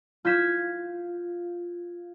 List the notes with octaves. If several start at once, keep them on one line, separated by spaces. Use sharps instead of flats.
F4 G6 G#6 B6 E7